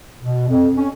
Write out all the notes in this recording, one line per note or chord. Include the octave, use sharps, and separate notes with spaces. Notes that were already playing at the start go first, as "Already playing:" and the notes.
B2
F2
C#4